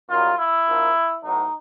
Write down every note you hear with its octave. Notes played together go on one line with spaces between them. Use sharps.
F#2 D#3 G3 F4
E4
A#1 A#2 F3
B1 A2 F#3 D#4